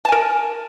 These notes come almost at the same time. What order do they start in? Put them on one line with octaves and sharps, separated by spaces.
A5 G#5 A#4